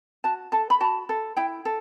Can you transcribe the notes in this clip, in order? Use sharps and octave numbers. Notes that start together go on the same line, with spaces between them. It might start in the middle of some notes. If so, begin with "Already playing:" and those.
F#4 A5
A4 A5
B5
F#4 A5
A4
E4 G5
A4